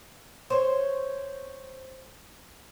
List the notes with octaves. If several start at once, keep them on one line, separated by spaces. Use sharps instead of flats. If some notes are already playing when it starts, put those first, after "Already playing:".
C5 C#5